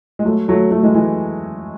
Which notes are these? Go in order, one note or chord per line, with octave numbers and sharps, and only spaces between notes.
G#3
F#3 A3
F#3 A3
F#3 A3
E3 G#3
E3 G#3